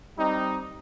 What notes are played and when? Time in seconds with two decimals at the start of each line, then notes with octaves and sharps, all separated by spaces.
0.18 G3 C4 D#4